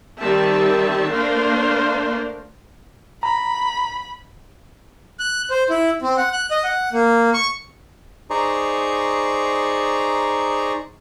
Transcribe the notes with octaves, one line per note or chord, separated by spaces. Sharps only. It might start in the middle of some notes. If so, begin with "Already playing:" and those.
D#3 G3 C4 E5 A5
A3 A#3 D4 A#4 C5 F5
A#5 B5
F#6
C5
E4
C4
F#5
F#6
D#5
F#5
A#3
C#6
D#4 G#4 C5 D5 A#5 C#6